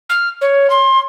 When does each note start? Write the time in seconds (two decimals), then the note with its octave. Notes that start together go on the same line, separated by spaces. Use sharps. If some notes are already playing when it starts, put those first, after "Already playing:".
0.09 F6
0.41 C#5
0.70 C6